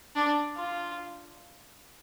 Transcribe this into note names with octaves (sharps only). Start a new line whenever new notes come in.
D4
F4